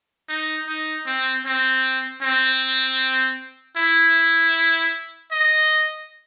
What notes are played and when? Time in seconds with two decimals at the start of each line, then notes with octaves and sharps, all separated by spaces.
0.29 D#4
0.68 D#4
1.06 C4
1.45 C4
2.22 C4
3.77 E4
5.31 D#5